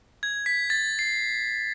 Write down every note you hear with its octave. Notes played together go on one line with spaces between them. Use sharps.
G#6
B6
A6
C7